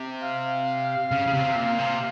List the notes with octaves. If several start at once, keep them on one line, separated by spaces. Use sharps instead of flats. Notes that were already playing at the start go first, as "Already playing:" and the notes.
Already playing: C3
F5
C#3
C#3
C3
A#2
C3